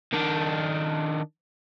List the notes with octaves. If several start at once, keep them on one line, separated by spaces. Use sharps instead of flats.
D#3 D4